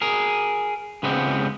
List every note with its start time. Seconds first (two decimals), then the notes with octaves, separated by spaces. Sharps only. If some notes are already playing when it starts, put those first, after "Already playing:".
0.01 G#4 A#4
1.03 C#2 G#3 B3 C4